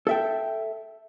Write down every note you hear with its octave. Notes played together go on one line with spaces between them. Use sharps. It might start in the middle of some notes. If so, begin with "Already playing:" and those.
A4 E5 G5